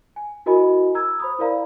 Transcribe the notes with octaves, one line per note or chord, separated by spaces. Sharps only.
G#5
E4 F#4 A#4 D#5 G#5 B5
A#5 E6 G#6
C5 B5 D#6
E4 A#4 D5 F5 A#5 B5